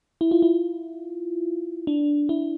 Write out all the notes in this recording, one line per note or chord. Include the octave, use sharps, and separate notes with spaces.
E4
F4
E4
D4
E4